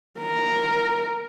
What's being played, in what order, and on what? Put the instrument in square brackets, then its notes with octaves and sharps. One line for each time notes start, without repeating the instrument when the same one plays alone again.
[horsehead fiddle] A#4